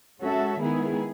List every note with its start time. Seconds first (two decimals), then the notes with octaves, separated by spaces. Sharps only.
0.21 G#3 C#4 F#4 A4 E5
0.59 D#3 G#3 B3 E4 G#4